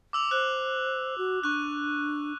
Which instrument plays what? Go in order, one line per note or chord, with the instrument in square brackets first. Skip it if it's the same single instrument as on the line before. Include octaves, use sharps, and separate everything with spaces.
[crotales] D6 E6 F7
[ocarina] C5 [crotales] F#6
[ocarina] F#4
[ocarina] D4 [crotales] C#6 F#6